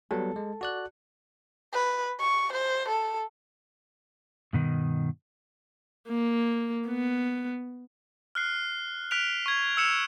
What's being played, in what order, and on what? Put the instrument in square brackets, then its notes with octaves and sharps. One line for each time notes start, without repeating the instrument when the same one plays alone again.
[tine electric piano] F#3 G3 B3 [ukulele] A4
[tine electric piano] G#3
F#4 D5 F#6
[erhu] B4
C#6
C5
A4
[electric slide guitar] G2 B2 D#3
[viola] A#3
B3
[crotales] F6 F#6 C7
F6 F#6 B6 D7 F7
C#6 G#6
E6 F6 C#7 E7 F7